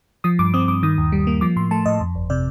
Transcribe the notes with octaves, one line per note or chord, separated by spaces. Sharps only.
F3 D#6
G2 D6
C4 D#6
G2 D6
D#3 D#6
D#2
G3
A#3
F3 D6
A2 C6
A3 A5
A2 D#5
F2
G1
C3 D5